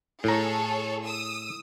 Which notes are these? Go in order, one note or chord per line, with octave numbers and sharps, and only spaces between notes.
A2 G#4 A4 C#5 A#5
D#6 E6